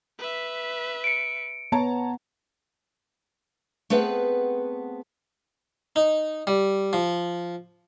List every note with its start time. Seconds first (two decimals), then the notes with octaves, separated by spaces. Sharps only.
0.19 B4 E5
1.04 C#7 D7
1.72 B3 C#5 A5 A#5
3.90 A3 B3 C4 G#4 B4 F#5
5.96 D#4
6.47 G3
6.93 F3